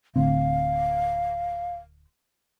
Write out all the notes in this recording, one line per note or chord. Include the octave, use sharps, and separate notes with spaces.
D1 D2 C4 F5